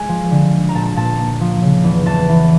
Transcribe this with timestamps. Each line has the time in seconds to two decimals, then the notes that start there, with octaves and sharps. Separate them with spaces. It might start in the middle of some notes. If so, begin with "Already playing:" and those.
Already playing: G#3 G#5
0.09 F3
0.31 D3
0.53 G#3
0.69 A#5
0.75 A#2 A5
0.86 A5
0.96 A#2 A5
1.18 A#3
1.41 F3
1.62 C#3
1.84 E2
2.06 E2 A5
2.29 E3